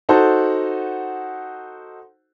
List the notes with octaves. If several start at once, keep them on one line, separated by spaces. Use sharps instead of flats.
D#4 F#4 A4 C5